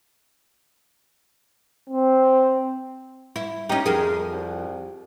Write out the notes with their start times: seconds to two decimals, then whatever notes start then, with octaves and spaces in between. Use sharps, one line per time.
1.90 C4
3.36 E4
3.69 C#4 D#4 G4
3.86 F2 G#4 A#4
4.31 C2